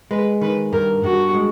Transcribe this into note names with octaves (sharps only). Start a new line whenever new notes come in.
G#3 B4
D#3 B4
G2 A#4
G2 F#4
G#3